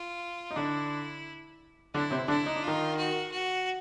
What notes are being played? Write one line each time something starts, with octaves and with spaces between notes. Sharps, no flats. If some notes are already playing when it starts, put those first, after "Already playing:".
Already playing: F4
D#4
D3 D4 E4
D3 D4 E4
C3 C4
D3 D4 E4
D#4
D4
D#3 D#4 F4
F#4
F#4